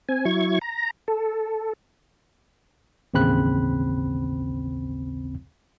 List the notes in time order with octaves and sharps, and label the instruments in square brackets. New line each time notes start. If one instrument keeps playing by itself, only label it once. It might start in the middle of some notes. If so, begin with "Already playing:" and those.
[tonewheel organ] C4 G#5
F#3 E4 C#6 G#6
A#5
A4
[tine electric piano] A1 D#2 C#3 C4 B5 F#6